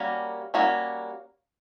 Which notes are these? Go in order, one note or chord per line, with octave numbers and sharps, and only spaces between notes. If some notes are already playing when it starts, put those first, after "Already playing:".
Already playing: G3 A#3 C#4 F#4
G3 A#3 C#4 F#4